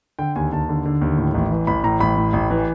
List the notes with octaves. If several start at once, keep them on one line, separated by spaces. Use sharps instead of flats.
D3 G5
D#2 G#5
D#2 A5
D3
D3
D#2
A2
A1
E3
A1 B5
A2 A#5
A1 B5
A2
A1
E3